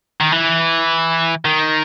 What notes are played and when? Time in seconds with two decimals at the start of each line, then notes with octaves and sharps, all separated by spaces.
0.21 D#3
0.32 E3
1.45 D#3